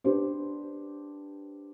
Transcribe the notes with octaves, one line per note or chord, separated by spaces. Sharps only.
D4 G4 B4 C5